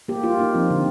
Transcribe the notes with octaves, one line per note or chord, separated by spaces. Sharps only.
A#3 G4
A#3 F4
A#3 D#4
F3 C4
D3